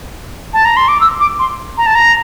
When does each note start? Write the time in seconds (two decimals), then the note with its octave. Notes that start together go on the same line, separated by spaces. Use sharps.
0.54 A5
0.65 A#5
0.77 C6
0.88 D6
1.01 E6
1.20 D6
1.39 C6
1.78 A#5
1.86 A5
1.95 A#5